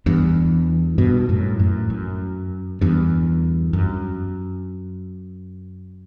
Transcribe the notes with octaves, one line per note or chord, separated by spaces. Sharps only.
E2 G2
G2 B2
F#2 A2
F#2 A2
F#2
E2 G2
F#2